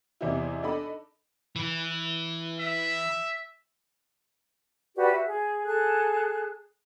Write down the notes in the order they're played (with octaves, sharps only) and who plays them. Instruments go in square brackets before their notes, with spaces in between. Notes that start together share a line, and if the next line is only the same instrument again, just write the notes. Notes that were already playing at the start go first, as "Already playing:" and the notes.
[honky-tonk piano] E2 C3 E3 C4 D#4 E4
D4 D#4 A4 D#5 B5
[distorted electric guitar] E3
[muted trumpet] E5
[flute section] F#4 G4 B4 D5
F#4 E5
G#4
G#4 A4 F#6